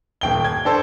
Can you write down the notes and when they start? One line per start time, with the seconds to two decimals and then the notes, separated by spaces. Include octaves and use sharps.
0.21 D#1 G5 G7
0.44 G#6
0.65 D4 A4 C5